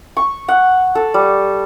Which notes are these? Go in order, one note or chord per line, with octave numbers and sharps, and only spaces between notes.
C#6
F#5
A4
G3